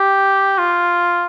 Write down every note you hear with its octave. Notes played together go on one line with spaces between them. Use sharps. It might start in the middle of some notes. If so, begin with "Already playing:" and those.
Already playing: G4
F4